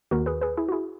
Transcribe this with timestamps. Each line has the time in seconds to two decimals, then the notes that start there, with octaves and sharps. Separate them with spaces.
0.11 D#2 D#3 F#4 A#4
0.26 G#4 B4
0.41 G#4 B4
0.57 E4 G#4
0.69 F#4
0.72 E4 G#4